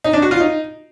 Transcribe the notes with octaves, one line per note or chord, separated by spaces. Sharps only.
D#4
D4
F#4
F4
D#4